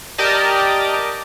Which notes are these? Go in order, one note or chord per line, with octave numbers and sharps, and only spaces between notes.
G4 A#4 D5 D#5 A5